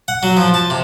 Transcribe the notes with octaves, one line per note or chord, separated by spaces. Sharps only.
F#5
F#3
F3
A5
C3